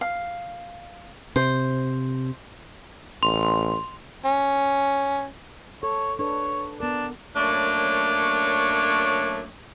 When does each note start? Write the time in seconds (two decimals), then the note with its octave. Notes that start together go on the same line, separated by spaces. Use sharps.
0.01 F5
1.36 C3 C5
3.23 A1 C6
4.25 C#4
5.83 A4 C#5
6.19 D4 A4 B4 C#5
6.80 B3 D4 A#4
7.36 F#2 A3 A#3 D4 C#5